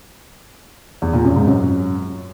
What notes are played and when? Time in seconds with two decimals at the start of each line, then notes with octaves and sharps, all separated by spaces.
1.02 E2
1.13 A#2
1.25 F#2
1.36 G#2
1.47 F#2